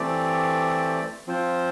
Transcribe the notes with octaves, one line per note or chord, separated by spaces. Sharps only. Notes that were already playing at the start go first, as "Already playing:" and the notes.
Already playing: E3 A3 C4 G4 D5
F3 C4 F4 C5